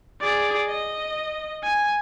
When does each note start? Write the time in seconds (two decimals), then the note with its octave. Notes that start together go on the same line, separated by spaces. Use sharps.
0.21 G#4 D5
0.68 D#5
1.63 G#5